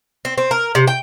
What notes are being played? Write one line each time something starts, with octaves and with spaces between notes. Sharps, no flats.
C4
C4
A#4
C3
G5